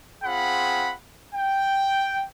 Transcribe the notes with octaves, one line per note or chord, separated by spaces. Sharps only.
C4 F4 G#4 F#5 B5
G5